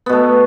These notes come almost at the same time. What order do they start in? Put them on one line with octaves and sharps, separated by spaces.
B3 B2 A3